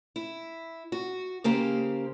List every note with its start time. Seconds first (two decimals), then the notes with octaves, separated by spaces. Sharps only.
0.16 E4
0.92 F#4
1.44 C#3 A#3 G4 C5